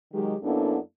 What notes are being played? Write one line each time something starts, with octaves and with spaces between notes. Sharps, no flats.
D#3 F#3 G#3 G4
F#2 A#3 B3 D4 E4 A4